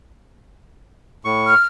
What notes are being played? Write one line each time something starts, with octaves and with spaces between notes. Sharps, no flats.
A2 C#6
F6